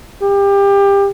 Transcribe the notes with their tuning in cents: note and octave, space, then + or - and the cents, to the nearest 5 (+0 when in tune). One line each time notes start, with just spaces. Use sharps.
G4 +25